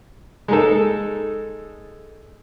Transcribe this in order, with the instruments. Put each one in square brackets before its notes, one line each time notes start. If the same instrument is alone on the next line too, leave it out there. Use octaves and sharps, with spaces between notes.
[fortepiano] G#3 D#4 A4